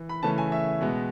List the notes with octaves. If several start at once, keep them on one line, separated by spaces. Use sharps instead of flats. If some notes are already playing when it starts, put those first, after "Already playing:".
Already playing: E3
B5
C#3 E3 A3 C#4 A5
G#5
E5
B2 G#3 B3